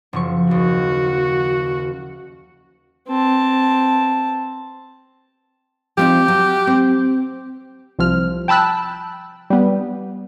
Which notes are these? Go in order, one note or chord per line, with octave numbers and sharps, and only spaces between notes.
F#1 F3 C#6
D#2 F#4
C4 A5
F3 C4 D#4 G4
F#3
C4
C2 F3 F6
G5 A5 B5 E6 F#6
G3 B3